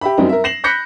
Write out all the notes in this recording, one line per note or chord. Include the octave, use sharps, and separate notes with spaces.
G4 E5 B5
F#2 F#3 G3 C4 D#4
A#4 E5
A#6 C7 E7 F#7
B5 F#6 G6 A#6 B6 C#7